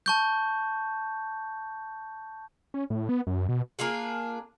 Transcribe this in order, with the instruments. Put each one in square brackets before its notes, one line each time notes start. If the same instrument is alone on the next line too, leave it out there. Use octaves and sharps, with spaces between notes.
[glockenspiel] A5 C#6 G6
[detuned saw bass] C#4
A2
B3
F#2
B2
[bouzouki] A#3 D4 F4 G#4